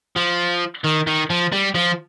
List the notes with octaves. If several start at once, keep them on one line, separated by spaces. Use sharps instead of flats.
F3
D#3
D#3
F3
G3
F3